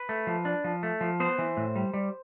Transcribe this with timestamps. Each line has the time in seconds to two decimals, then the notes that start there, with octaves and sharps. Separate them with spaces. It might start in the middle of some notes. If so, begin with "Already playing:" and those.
Already playing: B4
0.09 A3
0.27 F3
0.45 D4
0.64 F3
0.83 A3
1.01 F3
1.20 B3 C5
1.38 E3
1.57 A2
1.76 G3
1.94 G3